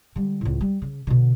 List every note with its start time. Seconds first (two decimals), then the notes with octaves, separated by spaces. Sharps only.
0.16 D3 G3
0.41 C#2 A2
0.61 G3
0.82 C#3
1.07 B2 D3